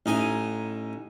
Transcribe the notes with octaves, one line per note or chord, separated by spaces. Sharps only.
A1 D#4 G#5